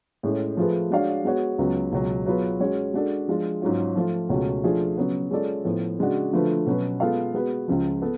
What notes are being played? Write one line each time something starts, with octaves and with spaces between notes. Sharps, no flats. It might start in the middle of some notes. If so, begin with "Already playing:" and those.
A2 G#3 C#4 G#4
F3 A3 F4 G#4 B4
G#3 D4 F#4 C#5 F5
G#3 B3 F#4 C#5
C#2 C#3 F#3 B3
C#2 B2 F#3
F#3 B3 F4 G#4 B4
G#3 C#4 F#4 C#5
G#3 D4 F#4 A4
F3 G#3 D4 F4
G#2 F#3 C#4 F4
F3 A3 F4
C#2 B2 A3 C#4 F#4
F3 A3 D4 F4 G#4
C#3 F#3 B3
G#3 C#4 F4 A4 D5
A2 F3 B3
C#3 G#3 D4 F#4
D3 F3 A3 F4 B4
B2 F#3 C#4 F#4 B4
G#3 B3 F4 A4 F5
G#3 B3 F#4 B4
C#2 C#3 F3
B3 A4